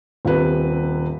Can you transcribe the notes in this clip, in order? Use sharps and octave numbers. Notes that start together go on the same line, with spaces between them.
D#1 C3 B4